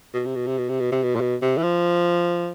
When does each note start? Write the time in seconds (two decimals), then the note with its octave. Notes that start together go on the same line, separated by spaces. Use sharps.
0.14 B2
0.25 C3
0.35 B2
0.47 C3
0.58 B2
0.69 C3
0.80 B2
0.92 C3
1.03 B2
1.16 A#2
1.21 B2
1.42 C3
1.58 E3
1.63 F3